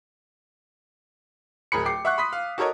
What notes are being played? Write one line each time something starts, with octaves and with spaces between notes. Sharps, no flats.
D1 G#4 A#4 B5 C#7
G5 D6 C7
E5 F#5 C#6 F#6
B5 C6 D#6 B6
F5
F#4 A4 A#4 C#5 D#5